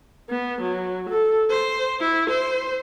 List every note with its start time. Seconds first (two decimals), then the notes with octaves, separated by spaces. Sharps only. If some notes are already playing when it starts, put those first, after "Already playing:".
0.30 B3
0.61 F#3
1.09 A4
1.50 C5
2.00 E4
2.30 C5